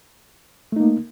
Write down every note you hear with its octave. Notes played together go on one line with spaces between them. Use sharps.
A3 A#3 D#4